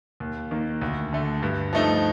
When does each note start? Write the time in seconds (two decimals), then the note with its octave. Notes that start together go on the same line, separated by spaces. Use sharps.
0.20 D#2
0.51 D#3 A#3
0.81 D2
1.13 D3 A3
1.43 G2
1.73 F3 A3 D#4